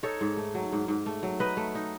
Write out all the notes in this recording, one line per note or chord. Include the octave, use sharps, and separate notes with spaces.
D#4 A4 C#5
G#2
A3
F#3
G#2
G#2
A3
F#3
D#4 B4 D#5
A3
D#4